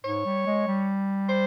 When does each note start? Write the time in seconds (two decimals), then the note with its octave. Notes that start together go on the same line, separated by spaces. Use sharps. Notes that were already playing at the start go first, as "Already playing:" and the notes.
0.04 G#2 C#5
0.25 G3
0.46 G#3
0.67 G3
1.29 C5